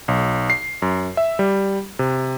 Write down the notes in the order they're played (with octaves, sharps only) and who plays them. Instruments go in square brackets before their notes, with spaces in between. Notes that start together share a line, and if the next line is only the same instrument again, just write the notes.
[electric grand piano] B1
C7
F#2
E5
G3
C3